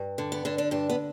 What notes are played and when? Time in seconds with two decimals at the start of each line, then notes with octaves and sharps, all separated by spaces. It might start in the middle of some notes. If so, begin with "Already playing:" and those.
Already playing: G2
0.18 D3
0.32 B3
0.45 D3 D4
0.58 D4
0.71 G2 D4
0.90 B3